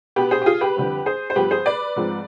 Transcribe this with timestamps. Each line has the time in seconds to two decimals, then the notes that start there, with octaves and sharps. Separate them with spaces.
0.16 B2 B3 G4 B4
0.31 G#4 C5
0.42 G4
0.46 F4 G#4
0.61 G4 B4
0.76 F2 D3 G3 C4
1.06 G#4 C5
1.30 C5
1.36 G2 F3 B3 G4 B4
1.51 G#4 C5
1.66 B4 D5
1.96 G#2 F3 G#3 C4